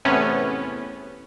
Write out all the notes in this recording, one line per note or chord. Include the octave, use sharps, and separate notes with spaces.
E2 A2 C3 B3 C#4